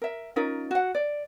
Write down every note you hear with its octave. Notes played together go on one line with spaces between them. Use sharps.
A#4 E5
C#4 D#4 F4 A#4
F#4 F#5
D5